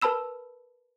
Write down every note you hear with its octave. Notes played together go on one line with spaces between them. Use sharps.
A#4 B4 A5 B5 E6 E7